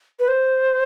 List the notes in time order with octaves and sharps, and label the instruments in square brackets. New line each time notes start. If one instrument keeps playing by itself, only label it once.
[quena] B4
C5